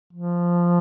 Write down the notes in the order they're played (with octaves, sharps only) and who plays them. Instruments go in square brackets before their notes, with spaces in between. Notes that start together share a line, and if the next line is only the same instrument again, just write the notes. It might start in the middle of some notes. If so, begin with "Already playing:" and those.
[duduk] F3